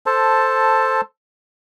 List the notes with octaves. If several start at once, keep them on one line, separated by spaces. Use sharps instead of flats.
A4 C5 A5